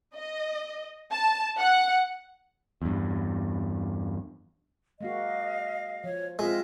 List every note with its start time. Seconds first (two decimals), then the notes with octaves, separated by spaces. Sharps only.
0.15 D#5
1.10 A5
1.60 F#5
2.82 E2 G2
5.01 G#3 A#3 F#4 D#5 F5
6.04 F3 C#5
6.39 G#3 C4 F4 D#5 E5